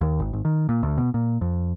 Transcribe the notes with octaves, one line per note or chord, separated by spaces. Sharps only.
D#2
G#1
G#1
D#3
A#2
D2
B2
A#2
F2